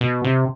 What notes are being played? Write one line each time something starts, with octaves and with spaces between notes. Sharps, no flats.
B2
C3